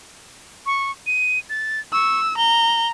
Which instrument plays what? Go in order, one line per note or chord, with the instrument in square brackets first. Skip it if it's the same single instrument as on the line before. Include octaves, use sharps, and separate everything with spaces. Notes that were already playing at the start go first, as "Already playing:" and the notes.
[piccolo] C#6
D#7
A6
[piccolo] C#6 [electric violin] E6
[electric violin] A#5 [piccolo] G7